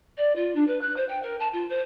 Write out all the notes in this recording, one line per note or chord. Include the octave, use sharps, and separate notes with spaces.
D5
F4
D4
B4
F#6
C5
G5
A#4
A5
F4
C5